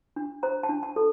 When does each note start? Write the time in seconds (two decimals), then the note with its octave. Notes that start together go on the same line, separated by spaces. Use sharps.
0.16 D4
0.43 C5 A#5
0.63 A5
0.69 D4
0.83 A5
0.96 A4